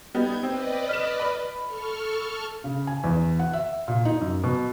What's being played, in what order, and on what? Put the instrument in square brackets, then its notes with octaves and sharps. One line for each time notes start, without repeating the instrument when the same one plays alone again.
[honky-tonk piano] G3 B3 D#4 [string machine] G6 G#6
[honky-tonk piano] C4 [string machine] B4 D5 D#5
[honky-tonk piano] F6 B6 E7
B5
[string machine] A4 C#6 F6
[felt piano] C#3
G#5
E2
F#5
E5
A#2
D#4
F#2
B2